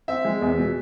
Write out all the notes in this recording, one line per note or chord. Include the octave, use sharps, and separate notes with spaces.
C4 E5
G#3
E2
B2